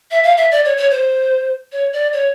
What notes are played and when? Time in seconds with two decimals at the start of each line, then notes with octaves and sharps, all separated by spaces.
0.11 E5
0.23 F5
0.37 E5
0.51 D5
0.65 C#5
0.77 C#5
0.91 C5
1.72 C#5
1.93 D5
2.13 C#5